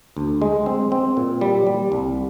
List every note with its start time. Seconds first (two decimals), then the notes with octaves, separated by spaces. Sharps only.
0.17 D2
0.42 G#3
0.66 C4
0.92 C4
1.17 A#2
1.41 G3
1.67 G3
1.92 C2